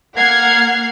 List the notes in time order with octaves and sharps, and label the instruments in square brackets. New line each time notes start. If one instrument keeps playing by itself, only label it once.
[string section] A#3 F#5 F6 G#6 C7